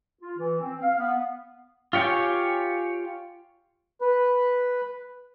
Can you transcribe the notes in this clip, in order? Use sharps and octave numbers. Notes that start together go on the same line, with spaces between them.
F4
E3
C4
F5
B3
F4 G4 C#5 G5 G#5
B4